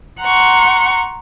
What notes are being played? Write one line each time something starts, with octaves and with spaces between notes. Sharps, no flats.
F#5 A#5 C6 C#6